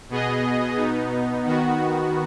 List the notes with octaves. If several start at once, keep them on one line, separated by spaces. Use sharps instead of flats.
B2 B3 G#4 D#5
B2 B3 D#4
D#3 B3 F#4